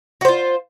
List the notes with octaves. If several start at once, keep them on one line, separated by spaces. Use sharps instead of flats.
F4 F#4 C5